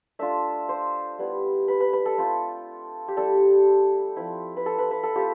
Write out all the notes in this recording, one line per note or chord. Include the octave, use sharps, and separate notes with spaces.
A3 D4 F4 E5
C5
G3 B3 E4
B4
B4
B4
A4
A3 C4 F4
G4
G3 C4 E4 A4
F3 C4 E4
B4
A4
B4
B4
A4
A3 C4 F4 G4